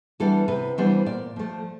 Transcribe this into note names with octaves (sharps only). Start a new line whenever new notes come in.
E3 G3 B3 D4 A4
C3 B4
E3 G3 B3 D4 C5
A#2 D5
F3 A3